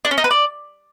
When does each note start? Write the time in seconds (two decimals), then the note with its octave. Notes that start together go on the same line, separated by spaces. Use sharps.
0.05 D4
0.11 C#4
0.18 D#4
0.24 B4
0.31 D5